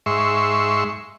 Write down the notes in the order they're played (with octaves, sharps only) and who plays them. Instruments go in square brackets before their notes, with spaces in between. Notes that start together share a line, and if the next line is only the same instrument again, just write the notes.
[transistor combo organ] G#2 E5 C6 C#6